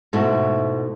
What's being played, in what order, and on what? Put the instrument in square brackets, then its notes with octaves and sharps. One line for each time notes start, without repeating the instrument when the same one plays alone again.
[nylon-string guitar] G#2 B2 A3 E4 F#4